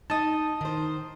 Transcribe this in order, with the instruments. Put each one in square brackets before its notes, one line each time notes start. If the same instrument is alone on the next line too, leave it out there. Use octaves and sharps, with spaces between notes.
[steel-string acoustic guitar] D#4 D#5 [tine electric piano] A5 D#6
[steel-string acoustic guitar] D#3 C5